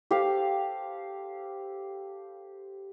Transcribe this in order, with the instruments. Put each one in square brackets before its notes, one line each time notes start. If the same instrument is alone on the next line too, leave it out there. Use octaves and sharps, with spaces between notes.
[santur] G4 A4 C5 F5